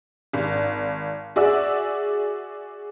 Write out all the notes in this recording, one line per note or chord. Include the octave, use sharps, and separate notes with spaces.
G#1
F#4 G#4 D5 E5 E6